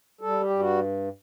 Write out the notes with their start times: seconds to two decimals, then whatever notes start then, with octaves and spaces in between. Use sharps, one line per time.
0.21 G3 A4
0.41 G4
0.50 G2
0.59 F#4